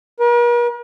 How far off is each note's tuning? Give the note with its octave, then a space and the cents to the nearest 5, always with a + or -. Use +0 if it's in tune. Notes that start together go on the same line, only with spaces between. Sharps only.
A#4 +45